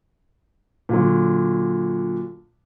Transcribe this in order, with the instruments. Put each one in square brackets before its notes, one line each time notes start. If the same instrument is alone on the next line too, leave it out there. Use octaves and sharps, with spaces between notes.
[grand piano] A#2 D3 F#3